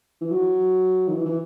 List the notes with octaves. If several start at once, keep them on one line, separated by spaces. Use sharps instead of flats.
E3
F#3
D#3
E3
E3